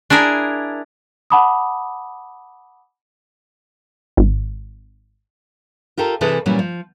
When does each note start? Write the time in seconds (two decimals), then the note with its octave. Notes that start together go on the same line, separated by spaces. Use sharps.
0.10 D4 E4 G#4 A#4
1.30 F#5 A5 B5 D6 D#6
4.17 G#1
5.97 F4 G4 A4 A#4
6.21 C3 E3 E4 G#4 A4 B4
6.46 A#2 E3 F#3 G3 C#4
6.59 F3